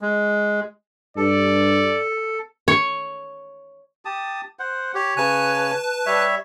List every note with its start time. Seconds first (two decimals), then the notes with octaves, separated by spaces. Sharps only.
0.01 G#3
1.17 G2 A4 D5
2.68 C#5
4.05 G4 A5 D#6
4.59 C5 F#5
4.95 G4 C#5
5.17 C#3 B4 G#5 A5 F#6
6.06 G3 C#5 E5